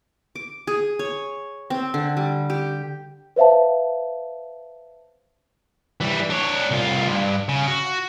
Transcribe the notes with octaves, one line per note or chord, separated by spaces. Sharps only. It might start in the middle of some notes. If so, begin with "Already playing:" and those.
D6
G#4
C#5
C4
D3
G3
G4
B4 C5 E5 F5 A5
E3 G3
D4 C#5
C2 F4
G2
C#3
F#4